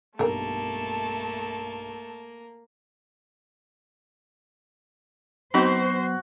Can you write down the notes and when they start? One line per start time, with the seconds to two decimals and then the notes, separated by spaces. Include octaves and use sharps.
0.19 B1 G2 A3 A#3 A4 A#4 A5 A#5
5.54 F#3 B3 C4 D#4 F#4 C5 B5